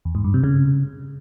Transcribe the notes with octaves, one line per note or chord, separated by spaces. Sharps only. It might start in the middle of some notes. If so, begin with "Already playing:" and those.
E2
G#2
G2
C3
C#3